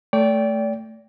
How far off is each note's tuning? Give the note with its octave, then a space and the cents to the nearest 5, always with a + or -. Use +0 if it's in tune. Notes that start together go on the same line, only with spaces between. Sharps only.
A3 +0 D5 -30 G5 +0